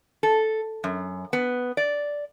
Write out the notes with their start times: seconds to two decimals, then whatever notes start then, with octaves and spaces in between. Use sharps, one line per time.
0.23 A4
0.84 F#2
1.33 B3
1.77 D5